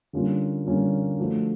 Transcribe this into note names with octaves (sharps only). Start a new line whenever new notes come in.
D3 G3 A#3 C#4 F4
D3 G3 A#3 C#4 F4
F3 A3 D4 F#4